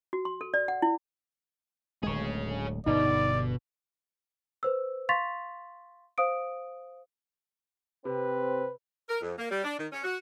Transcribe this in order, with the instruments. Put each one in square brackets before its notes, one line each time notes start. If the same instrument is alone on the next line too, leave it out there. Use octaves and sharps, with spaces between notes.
[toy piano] F#4
C6
A4
D5
F#5
E4
[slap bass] D1 D2 G#3 [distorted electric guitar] G#4 C#5
[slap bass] G1 G2 [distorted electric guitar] B2 [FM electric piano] D#4 [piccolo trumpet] D5
[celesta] B4 C5 E6
F5 C6 C#6 A6 B6 F7
C5 F5 D#6 D7
[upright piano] C3 [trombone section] C4 [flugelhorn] B4
[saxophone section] A#4
F2
A#3
G3
D4
D#3
C#4
F#4